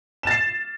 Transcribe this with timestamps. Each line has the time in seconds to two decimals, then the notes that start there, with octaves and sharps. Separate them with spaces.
0.23 E7
0.27 A6
0.31 C7